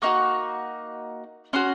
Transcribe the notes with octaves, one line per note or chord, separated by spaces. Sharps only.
A#3 D#4 F#4 C#6
C#4 F#4 C6